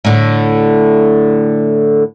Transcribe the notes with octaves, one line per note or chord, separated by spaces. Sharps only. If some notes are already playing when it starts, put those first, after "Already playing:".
A2 D3